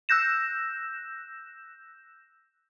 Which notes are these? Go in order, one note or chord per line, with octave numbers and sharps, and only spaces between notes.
E6 F#6 G6 A#6 E7